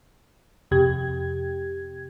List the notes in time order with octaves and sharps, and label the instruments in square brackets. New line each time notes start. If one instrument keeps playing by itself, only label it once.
[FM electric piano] F2 C3 G4 G#6